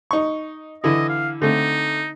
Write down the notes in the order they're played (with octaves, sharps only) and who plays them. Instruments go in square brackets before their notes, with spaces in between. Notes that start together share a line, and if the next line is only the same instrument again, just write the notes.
[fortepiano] D#4 C#6
[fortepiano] D3 E3 E4 [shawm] D#5
[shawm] F5
[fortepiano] D3 A3 C4 [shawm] D#4